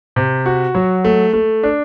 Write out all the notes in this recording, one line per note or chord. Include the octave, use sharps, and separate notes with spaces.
C3
F#4
F#3
A3
A3
D4